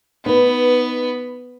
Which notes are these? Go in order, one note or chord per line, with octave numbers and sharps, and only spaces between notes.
B3 D#4 B4